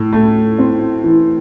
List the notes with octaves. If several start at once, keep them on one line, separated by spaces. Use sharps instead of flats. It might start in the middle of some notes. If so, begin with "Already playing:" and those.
Already playing: A2
A3
C4
E3